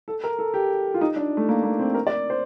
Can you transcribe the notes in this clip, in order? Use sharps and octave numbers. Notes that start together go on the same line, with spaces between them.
A4
A#4
A4
G4
F4
D#4
D4
A3
A#3
A#3
C4
A#4
D5
C5